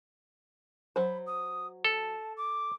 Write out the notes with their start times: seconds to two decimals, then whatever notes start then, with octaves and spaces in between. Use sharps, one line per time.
0.96 F#3 C5 B5
1.27 D#6
1.84 A4 A5
2.37 D6